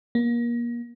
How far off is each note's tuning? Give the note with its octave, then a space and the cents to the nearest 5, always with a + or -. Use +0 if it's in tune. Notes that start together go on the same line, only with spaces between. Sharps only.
A#3 +30